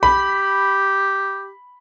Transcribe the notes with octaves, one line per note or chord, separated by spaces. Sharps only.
G4 B5